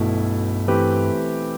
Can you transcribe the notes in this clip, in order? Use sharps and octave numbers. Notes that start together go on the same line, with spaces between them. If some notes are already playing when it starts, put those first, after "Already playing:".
Already playing: B1 G2 B2 A3 E4
E3 A3 C4 G4 B4